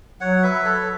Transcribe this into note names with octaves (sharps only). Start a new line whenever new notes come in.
F#3 C#5 F#5
B4 E5
A4 C#5